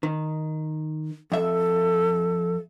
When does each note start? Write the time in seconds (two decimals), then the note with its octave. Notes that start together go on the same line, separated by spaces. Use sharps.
0.03 D#3
1.32 F2 A4 E5